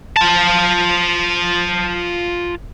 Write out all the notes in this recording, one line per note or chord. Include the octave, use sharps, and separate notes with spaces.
F4 A5